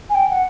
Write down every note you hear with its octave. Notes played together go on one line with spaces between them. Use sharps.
G#5
G5
F#5